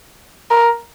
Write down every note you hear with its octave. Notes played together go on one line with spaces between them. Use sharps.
A#4